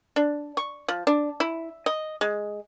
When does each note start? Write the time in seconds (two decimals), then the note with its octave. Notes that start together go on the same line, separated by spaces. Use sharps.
0.16 D4
0.57 C#6
0.88 F3
1.07 D4
1.40 E4
1.86 D#5
2.21 G#3